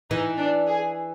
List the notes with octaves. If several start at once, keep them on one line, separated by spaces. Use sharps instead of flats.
E3 D#4
D4
G#4